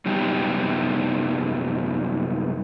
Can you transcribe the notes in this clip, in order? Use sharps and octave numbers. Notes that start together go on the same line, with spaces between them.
F#2 C3 G3 B3 D#4 G4